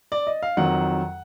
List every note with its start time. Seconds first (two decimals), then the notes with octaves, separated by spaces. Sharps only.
0.12 D5
0.27 D#5
0.42 F5
0.57 F2 D#3 F#3 F#5